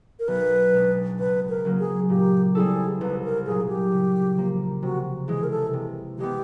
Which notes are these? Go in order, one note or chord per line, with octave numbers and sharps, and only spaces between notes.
A#4
B1 B4
B2 G#3 B3 D4
C#2 B4
A#4
C#3 F#3 A#3
G#4
A#2 G4
G3 C4 E4 G#4 A4
C2 B4
A#4
A#2 F#3 G#4
G4
C#3
F3 A#3
C3 F#4
E3 G#3 G#4
A#4
A4
C3
E3 G#3 B3 G4